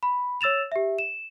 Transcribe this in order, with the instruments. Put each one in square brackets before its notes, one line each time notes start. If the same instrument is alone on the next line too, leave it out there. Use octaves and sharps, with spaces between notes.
[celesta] B5
C#5 E6 A6 E7 F7
G4 E5
E7